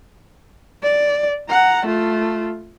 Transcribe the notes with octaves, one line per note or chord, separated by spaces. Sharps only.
D5
F#5 A#5
A3 F4